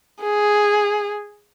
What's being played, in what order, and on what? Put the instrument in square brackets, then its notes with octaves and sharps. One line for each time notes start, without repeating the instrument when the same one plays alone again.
[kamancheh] G#4